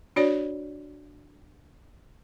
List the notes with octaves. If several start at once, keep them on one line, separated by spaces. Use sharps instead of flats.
D4 F#4 C#5 D5